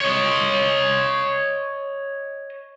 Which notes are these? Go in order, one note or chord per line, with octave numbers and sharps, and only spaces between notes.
C#5 D#5